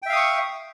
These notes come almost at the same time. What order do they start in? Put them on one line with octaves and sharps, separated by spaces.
G5 E5 F5 D#6 C#6